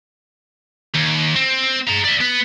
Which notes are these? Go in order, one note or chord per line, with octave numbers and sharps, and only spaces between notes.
D#2
C4
G#4 A#5
D5 E5
B3